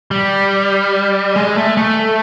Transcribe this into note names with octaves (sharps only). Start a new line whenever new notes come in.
G3
G#3
A3
A3